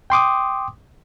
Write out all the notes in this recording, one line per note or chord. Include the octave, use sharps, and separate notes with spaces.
G5 C6 D6 D#6